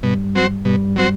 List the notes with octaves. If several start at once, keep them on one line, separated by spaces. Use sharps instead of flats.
G2 B2 G3
F#3 C4 F#4 C5
G2 B2 G3
F#3 C4 F#4 C5